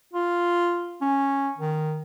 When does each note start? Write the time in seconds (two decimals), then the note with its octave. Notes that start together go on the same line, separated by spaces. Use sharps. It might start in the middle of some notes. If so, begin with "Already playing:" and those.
0.13 F4
1.01 C#4
1.58 D#3